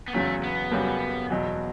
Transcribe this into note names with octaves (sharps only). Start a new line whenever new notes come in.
B3
E2 C#3 F#3 A3 C#4
B3
F#2 C#3 G3 C#4 F#4
E2 B2 F#3